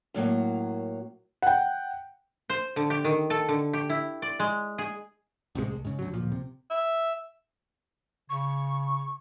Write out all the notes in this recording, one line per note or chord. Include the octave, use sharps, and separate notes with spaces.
F#2 A2 F#3 A#3
F#5 G5
C5
D3
G4
D#3
A4
D3
G4
E4
D5
G#3
G#4
A1 C3 F3 G#3
C2
G#2 C#3
D2 F#3
D1 A#2 F3
C3
E5
C#3 C#6